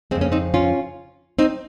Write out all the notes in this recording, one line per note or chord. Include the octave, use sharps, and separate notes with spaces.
F2 C#3 G#3 C4
A#3 C#4
C4 D#4
C#4 F4
C4 D#4